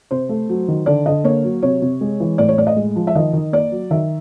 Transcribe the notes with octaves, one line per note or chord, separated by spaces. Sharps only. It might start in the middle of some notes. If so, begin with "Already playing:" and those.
C3 C5
A3
F#3
D#3
D3 D5
D3 D#5
A#3 C#5
F#3
C3 C#5
C3
G#3
E3
A2 D5
C#5
A2 D5
D#5
G#3
F3
E5
D#3 D#5
D#3
A#3 D5
F#3
D#3 E5